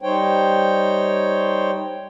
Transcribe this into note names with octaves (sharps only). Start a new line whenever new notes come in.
G3 D#4 C5 C#5 G5